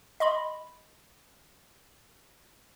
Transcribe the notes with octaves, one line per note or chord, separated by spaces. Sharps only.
D#5 B5 C6